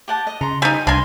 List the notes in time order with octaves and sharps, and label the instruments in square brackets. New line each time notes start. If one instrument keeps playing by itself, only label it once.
[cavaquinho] G4 F#5 A5
D#5
[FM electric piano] C#3 [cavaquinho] A#5 C6
[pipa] G3 D#4 [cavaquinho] G#5
[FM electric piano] C2 [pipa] D4 G#5 [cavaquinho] A#4 C6